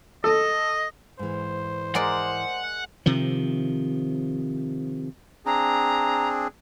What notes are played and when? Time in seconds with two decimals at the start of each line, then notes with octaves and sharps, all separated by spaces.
0.24 A4 D#5
1.19 G#2 E3 C5
1.95 G#3 A#4 D5 F#5
3.06 C3 D#3 F3
5.46 C4 D4 G#4 A#5